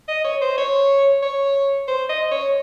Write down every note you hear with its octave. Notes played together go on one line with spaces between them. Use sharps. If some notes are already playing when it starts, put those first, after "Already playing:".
D#5
C#5
C5
C#5
C#5
C5
D#5
C#5